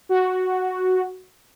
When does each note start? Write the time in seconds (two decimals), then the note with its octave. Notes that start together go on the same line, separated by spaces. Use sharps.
0.09 F#4